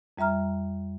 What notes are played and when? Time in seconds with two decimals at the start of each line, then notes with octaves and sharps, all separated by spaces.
0.18 F2 G3 E5 A#5 F6